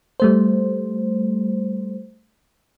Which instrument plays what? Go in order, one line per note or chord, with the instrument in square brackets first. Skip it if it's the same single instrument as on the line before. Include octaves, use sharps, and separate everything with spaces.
[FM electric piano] G3 A3 C5